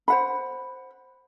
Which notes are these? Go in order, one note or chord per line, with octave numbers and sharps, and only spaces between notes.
C5 F#5 B5